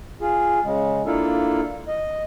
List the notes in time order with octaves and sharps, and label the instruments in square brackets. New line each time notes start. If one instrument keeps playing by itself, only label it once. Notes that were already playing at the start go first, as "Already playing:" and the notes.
[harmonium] F4 G#4
C#3 G#3
A#3 D4 E4 F4 A4
D#5